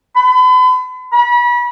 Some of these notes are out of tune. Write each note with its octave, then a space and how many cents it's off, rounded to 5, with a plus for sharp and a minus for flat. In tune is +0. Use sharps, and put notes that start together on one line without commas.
B5 +40
B5 -35